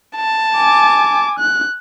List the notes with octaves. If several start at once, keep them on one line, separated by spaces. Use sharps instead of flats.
A5
G#5 D6
F#6